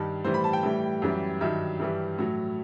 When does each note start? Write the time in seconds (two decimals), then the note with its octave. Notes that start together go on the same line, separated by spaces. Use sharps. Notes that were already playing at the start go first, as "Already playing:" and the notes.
Already playing: G2 D#3 G3 A5
0.24 A2 E3 G3 C5
0.34 B5
0.44 A5
0.53 G5
0.63 A2 E3 G3
1.02 F#2 E3 G3
1.41 G2 D#3 F#3 E5
1.80 G2 E3 G3
2.19 A2 F#3